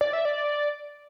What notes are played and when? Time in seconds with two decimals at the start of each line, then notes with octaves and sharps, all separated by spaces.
0.01 D5
0.13 E5
0.25 D5